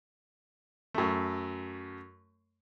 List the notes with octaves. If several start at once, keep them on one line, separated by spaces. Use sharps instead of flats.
F#2 A3